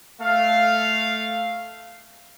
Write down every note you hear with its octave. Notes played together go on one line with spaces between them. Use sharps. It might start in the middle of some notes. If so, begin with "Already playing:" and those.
A3 F5